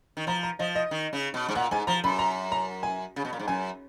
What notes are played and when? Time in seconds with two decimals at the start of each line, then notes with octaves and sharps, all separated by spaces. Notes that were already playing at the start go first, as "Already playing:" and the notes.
0.17 D#3
0.27 F3 A#5
0.43 A#5
0.59 F3 D#5
0.75 D#5
0.91 D#3
1.13 C#3
1.34 B2
1.49 G#2
1.55 A#2 F#5
1.71 G#2 G#5
1.87 F3 A#5
2.04 F#2 B5
2.19 A#5
2.52 A#5
2.83 G#5
3.16 C#3
3.25 B2
3.33 A#2
3.39 G#2
3.48 F#2 G#5